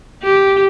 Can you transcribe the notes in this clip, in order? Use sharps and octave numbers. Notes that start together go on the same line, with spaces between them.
G4